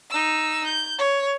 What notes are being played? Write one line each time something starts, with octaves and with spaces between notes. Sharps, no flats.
D#4 E6
G6
C#5